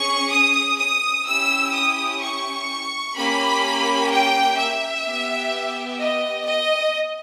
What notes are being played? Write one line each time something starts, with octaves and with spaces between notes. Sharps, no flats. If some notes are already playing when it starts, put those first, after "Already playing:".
Already playing: C#4 G#4 C#6
D#6
D#6
C#4 E4 G4 E6
D#6
C#6
A#3 C#4 G4 B5
G5
E5
B3 G4
D#5
D#5